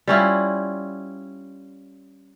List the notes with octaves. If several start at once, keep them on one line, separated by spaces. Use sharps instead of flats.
G3 C#4 E4 F4